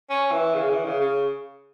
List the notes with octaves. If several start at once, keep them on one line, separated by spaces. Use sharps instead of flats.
C#4
E3
C#3
E3
C#3
C#3